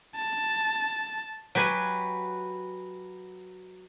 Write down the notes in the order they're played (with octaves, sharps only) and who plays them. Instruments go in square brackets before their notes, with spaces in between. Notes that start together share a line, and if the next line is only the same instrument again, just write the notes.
[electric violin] A5
[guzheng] F#3 G4 B4 G#5 B5